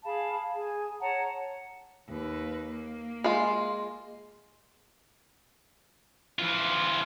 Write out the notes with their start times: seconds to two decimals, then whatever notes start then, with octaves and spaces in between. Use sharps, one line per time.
0.05 G#4 F5 A5 B5
0.55 G#4
1.01 C#5 F#5 A5 A#5
2.08 D#2 B4
2.67 A#3
3.24 G#3 F4
6.39 E3 F4